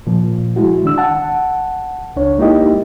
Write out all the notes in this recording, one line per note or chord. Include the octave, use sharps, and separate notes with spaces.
A#2 F3
G#3 E4 F#4
D#3 D4 E6
F#5 A5
C#2 D4 C#5
G#3 A#3 D#4 E4 G4 D#5